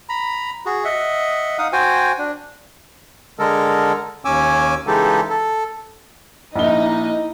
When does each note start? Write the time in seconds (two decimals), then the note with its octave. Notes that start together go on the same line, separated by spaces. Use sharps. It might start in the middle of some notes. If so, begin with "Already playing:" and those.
0.09 A#5 B5
0.66 F#4 G#4
0.85 D#5 E5 F#5
1.58 D#4 F5 F#5 D#6
1.73 F#4 C5 G5 G#5
2.18 D4
3.39 D3 G#3 A4 A#4
4.25 D#2 C#4 G#5 D6 E6
4.87 C#3 E3 G#3 D#4 G4 A4
5.30 A4
6.55 A#1 A#3 D#4 E4 D#5 G7